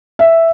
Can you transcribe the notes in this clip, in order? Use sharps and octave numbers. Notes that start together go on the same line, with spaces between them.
E5